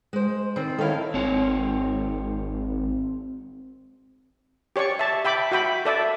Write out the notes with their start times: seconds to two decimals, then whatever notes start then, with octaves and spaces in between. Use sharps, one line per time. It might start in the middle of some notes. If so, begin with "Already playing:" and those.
0.13 G#3 C5
0.56 D#3 C4
0.78 D#3 C#4 E4 A4 F5
1.14 G#1 C4 C#5
4.76 G4 C#5 D5 C#6
4.99 E5 A5
5.25 E5 G5 B5 D6
5.51 F#4 E5 G5 B5
5.85 A4 D5 E5